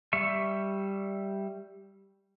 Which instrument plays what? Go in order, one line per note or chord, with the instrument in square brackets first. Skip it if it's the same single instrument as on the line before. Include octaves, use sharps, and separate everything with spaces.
[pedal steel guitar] G3 E5 C#6